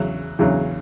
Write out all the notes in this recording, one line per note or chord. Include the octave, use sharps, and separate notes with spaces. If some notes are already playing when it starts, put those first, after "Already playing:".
Already playing: E2 C#3 F#3
E2 C#3 F#3